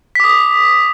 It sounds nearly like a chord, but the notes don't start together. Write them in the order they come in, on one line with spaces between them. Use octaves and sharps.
B6 D6 D#6